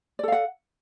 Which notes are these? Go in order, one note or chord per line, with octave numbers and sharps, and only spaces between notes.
A4 D5 F5 F#5